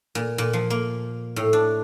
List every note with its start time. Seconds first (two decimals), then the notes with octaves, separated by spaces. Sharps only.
0.15 A#2
0.38 A#2
0.53 F3
0.70 A#3
1.36 A2
1.53 D4